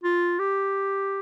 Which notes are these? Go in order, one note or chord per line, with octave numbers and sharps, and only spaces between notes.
F4
G4